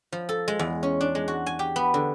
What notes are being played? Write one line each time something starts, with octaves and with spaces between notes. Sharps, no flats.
F3
A4
G#3
E2
C#4
D4
G#3
F#4
G#5
G4
B3
D3